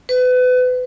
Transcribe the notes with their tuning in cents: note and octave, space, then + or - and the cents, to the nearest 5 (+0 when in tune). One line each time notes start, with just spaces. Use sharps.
B4 +30